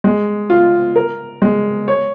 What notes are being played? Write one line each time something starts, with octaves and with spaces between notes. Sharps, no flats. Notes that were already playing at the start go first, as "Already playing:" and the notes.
G#3
F4
A#4
G#3
C#5